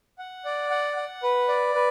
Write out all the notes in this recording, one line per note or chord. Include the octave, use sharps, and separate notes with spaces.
F#5
D5
F#5
F#5
B4
D5
B4